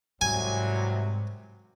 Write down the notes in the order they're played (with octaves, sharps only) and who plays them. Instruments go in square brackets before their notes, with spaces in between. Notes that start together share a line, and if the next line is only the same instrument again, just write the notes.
[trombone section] C2 C3 F#3 [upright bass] G#2 [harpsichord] G#5